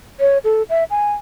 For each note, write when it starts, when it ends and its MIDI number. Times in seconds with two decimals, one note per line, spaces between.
0.20 0.38 73
0.44 0.62 69
0.69 0.84 76
0.90 1.13 80